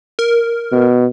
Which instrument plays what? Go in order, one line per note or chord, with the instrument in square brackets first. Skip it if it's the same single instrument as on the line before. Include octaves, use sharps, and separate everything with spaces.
[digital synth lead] A#4
[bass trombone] B2